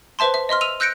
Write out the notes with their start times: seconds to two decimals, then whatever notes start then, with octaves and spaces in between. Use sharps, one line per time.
0.19 B4 C5 E5 A5 C6
0.34 E5
0.49 D#5 E5 C6 F6
0.61 E6 D#7 F7
0.80 E6 F#6 G6 A#6 C#7 D7